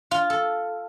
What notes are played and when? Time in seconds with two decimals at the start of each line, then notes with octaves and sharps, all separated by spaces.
0.11 F4
0.30 A4